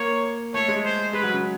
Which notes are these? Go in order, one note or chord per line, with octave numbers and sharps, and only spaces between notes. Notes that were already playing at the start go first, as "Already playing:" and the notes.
Already playing: A#3 C#5
A3 C#5
G#3
C5
G#3 B4
F#3
C#3